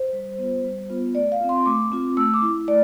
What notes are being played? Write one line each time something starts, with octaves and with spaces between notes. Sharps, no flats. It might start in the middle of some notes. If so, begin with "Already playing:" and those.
Already playing: C5
G3
B3 F4
G3
B3 F4
A3 D5
F5
C4 F4
C6
A3 D6
C4 F4
A3 E6
D6
E4
A3 D5